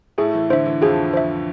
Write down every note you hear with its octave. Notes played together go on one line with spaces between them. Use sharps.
A2 A3 G#4
E3
D3 C5 E5
E3
F2 F3 G#4
C5 E5